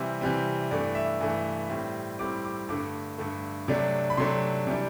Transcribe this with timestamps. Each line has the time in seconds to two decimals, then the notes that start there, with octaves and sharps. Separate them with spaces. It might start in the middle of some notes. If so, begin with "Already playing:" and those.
Already playing: C3 E3 G3 C4 E5
0.21 C3 E3 G3 C4
0.71 G2 E3 A3 D5
0.95 E5
1.20 G2 E3 A3
1.70 A2 G3 C4
2.19 A2 G3 C4 D6
2.44 D6
2.69 G2 D3 A3 D6
3.18 G2 D3 A3
3.68 C3 F#3 A3 D4
4.10 B5
4.17 C3 F#3 A3 D4 C6
4.67 C3 E3 G3 D4